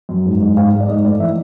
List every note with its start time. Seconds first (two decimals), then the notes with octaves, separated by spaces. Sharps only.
0.09 F#2
0.25 G#2
0.40 G#2
0.57 G#2 F5
0.72 G#2
0.80 D5
0.88 G#2 D#5
1.04 A3 D5
1.19 E3 E5